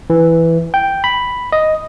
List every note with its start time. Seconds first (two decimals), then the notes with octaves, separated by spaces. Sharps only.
0.10 E3
0.74 G5
1.04 B5
1.52 D#5